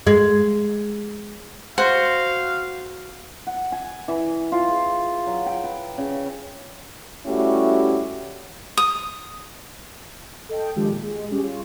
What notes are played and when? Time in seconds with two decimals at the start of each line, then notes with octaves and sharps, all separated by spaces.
0.07 G#3
1.78 F#4 C5 F5
3.47 F#5
3.72 G#5
4.08 E3
4.52 F4
4.68 G#4
5.26 F#3
5.46 G5
5.64 B4
5.98 C#3
7.26 G3 A3 C#4 E4 F#4 G4
8.77 D#6
10.49 A4 D#5 G5
10.76 D#3 F3 G#3 D4 F4 G4
10.89 A#2
11.02 G#3
11.31 G3 C#4 G4 G#4
11.42 F4 C#5